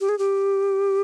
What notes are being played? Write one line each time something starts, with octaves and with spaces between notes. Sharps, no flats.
G4
G#4
G4